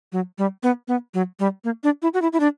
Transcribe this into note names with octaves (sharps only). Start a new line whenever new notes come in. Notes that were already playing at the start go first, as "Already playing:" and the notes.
F#3
G3
B3
B3
F#3
G3
A#3
D4
E4
F#4
E4
E4
D4